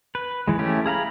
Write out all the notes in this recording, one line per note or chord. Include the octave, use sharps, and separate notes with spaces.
B4
E3 G#3
A3 C#4 E4 G4
G#4 F5 A#5 B5